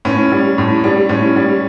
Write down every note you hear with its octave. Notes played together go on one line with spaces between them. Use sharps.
A2 C#4
G3
A2
G3
A2 C#4
G3